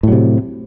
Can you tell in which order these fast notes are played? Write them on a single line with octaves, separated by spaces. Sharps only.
A2 F#3 C3